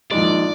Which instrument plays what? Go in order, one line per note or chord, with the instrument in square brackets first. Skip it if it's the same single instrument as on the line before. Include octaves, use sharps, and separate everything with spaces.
[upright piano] A#1 G#2 D#3 G#3 [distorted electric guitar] D5